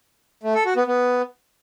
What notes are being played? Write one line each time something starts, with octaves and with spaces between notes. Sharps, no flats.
A3
A4
F#4
B3
B3